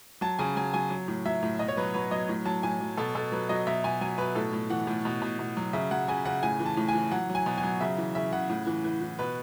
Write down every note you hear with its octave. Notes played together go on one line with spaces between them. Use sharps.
F#3 A5
C#3 G#5
F#3 G#5
F#3 G#5
F#3
A2
F#3 E5
A2
B2 D#5
C#5
F#3 B4
F#3 B4
F#3 D#5
A2
F#3 A5
A2 G#5
F#3
B2 A4
B2 A4
F#3 B4
F#3 D#5
B2 E5
B2 G#5
F#3 G#5
B2 B4
A2 A4
A2
E3 F#5
A2
B2
B2
B2
F#3
C#3 E5
F#3 F#5
C#3 G#5
C#3 F#5
A2 G#5
E3
A5
A2
G#5
E3
F#3 F#5
F#3
G#5
B2
G#5
F#3
C#3 E5
E3
C#3 E5
C#3 F#5
A2
E3
E3
E3
B2 B4